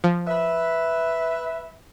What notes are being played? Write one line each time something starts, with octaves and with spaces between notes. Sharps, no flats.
F3
B4 E5